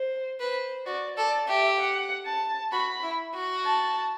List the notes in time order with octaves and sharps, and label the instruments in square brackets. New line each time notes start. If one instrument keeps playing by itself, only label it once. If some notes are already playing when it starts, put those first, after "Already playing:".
Already playing: [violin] C5
[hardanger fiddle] B4 [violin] C5
[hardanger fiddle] F#4 [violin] D5
[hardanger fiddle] A4 [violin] D5
[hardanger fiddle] G4 [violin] E5
[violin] F#5
A5
[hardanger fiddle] F#4 [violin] B5
[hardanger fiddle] E4
F#4
[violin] A5